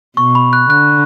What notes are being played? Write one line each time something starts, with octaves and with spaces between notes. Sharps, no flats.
B2 C#6
B5
F#6
D3 F#6